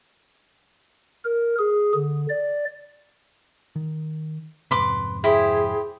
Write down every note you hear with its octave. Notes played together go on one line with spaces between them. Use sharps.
A#4
G#4
D3
D5
D#3
F2 G#2 C3 B4 C6 D6
E4 G4 G#4 C5